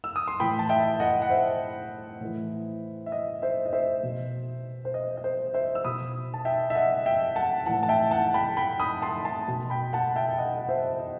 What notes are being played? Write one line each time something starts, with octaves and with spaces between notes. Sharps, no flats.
E6
D#6
C6
A2 E3 G5 B5
A5
E5 G5
D#5 F#5
F#5
C5 E5
A2 E3
E5
D#5
C5 E5
D#5
C5 E5
B2
C5
D#5
D#5
C5
C5 E5
E6
B2 B5 D#6
A5
E5 G5
E5
D#5 F#5
E5 G5
F#5 A5
A2 E3 F#5 A5
A5
E5 G5
F#5 A5
G5 B5
G5 B5
B5 D#6
A5 C6
A5 C6
B2
G5 B5
F#5 A5
E5 G5
G5
D#5 F#5
F#5
C5 E5
D#5